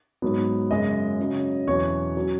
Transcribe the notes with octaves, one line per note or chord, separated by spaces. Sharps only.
G#2 F#3 B3
F#2 C#3 G#3 D#5
C#3 F#3 C#4
E2 B2 F#3 C#4 C#5
F#3 C#4